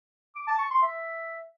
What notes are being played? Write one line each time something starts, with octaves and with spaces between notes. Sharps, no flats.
D6
A5
C#6
C6
E5